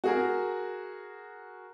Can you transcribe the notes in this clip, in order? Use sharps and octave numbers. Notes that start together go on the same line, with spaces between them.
F#4 G#4 A#4